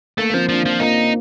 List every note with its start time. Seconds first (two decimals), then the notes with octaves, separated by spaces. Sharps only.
0.18 A3 A#3
0.30 A#3
0.34 F3 C4
0.49 F3 D4
0.65 F3 F4
0.80 A#3 D#4